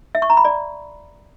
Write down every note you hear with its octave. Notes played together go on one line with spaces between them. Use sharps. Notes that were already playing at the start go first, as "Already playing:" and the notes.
E5
C#6
A#5
B5
D5